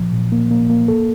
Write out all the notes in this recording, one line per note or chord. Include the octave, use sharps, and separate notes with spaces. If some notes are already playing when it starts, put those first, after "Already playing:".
Already playing: A#2 F3
A#2
A#3
A#3
A#3
A4